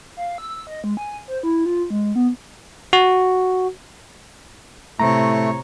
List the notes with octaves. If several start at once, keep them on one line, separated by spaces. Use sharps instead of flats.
F5
E6
D#5
G#3
G#5
C5
E4
F4
G#3
B3
F#4
A2 C3 A3 C#5 A#5